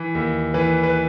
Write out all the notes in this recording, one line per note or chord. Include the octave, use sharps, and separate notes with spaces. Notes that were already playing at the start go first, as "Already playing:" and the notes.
Already playing: E3
D#2
E3 B4
B4